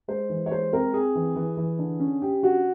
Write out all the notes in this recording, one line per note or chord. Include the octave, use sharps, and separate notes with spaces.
G#3 C5
E3
C#5
G#3 C5
C4 A#4
C4 G#4
E3
E3
E3
D3
C#4
C#4 G4
D3 F#4